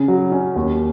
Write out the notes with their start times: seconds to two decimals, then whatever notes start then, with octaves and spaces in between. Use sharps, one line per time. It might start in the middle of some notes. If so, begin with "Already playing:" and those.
Already playing: C#3
0.08 F#3
0.32 C#4
0.56 D#2